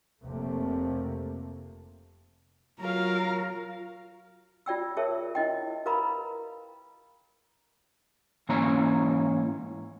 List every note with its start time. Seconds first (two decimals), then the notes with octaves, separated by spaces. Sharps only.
0.23 F1 C3 A3 A#3
2.80 F#3 F4 A#4 F5 A#5
4.66 F4 D5 G5 E6
4.97 G#4 A#4 C#5 E5 A5
5.35 E4 D#5 G5
5.86 A#4 B4 F5 A#5 B5
8.49 G#2 E3 A#3 C#4 C#5 A#5